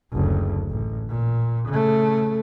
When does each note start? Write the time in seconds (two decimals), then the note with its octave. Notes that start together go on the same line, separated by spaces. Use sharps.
0.13 F#1 D2
0.68 A1
1.08 A#2
1.68 C#3 A3